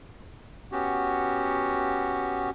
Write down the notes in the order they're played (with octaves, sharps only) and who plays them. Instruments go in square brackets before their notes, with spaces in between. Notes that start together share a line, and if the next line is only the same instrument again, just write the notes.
[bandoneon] B3 C#4 F#4 G4